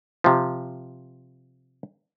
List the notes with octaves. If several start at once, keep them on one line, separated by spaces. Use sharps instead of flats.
C3 F3